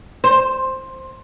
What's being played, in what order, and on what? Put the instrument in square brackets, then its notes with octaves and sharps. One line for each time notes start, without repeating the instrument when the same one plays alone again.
[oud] C5